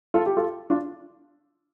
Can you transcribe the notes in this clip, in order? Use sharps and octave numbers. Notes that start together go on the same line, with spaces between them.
F4 A4
G4
F4 A4
D4 F4